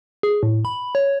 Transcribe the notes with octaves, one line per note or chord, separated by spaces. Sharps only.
G#4
A2
B5
C#5